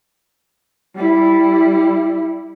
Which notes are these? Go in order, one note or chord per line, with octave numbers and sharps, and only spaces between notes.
G3 E4